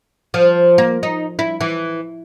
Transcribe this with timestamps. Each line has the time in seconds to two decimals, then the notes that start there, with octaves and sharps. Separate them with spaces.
0.34 F3
0.78 A#3
1.03 D#4
1.39 E4
1.61 E3